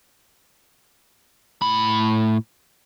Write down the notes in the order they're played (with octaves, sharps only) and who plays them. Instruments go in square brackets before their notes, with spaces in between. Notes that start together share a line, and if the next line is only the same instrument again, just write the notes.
[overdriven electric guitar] A2 B5